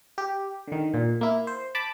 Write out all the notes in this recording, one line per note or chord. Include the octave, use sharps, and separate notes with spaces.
G4
D3 D#3
A#2
A#3 E4
C5
A5 B5 D6